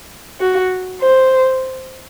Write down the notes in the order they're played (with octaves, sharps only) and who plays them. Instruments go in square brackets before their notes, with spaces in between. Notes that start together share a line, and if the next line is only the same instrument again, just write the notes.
[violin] F#4
C5